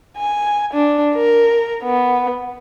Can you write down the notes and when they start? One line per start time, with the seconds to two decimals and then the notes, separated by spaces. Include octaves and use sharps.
0.18 G#5
0.73 D4
1.14 A#4
1.84 B3